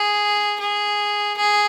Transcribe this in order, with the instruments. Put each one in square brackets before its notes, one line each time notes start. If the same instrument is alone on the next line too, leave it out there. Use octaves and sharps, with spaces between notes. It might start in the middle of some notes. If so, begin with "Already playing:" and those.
Already playing: [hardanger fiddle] G#4
G#4
G#4